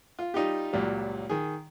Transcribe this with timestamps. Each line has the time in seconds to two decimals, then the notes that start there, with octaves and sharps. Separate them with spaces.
0.19 F4
0.34 G3 D#4 F4 G4
0.73 C#2 A#2 F#3 G3
1.29 D#3 G#4